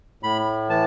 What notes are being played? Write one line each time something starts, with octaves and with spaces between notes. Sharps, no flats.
A2 B5
E3 A5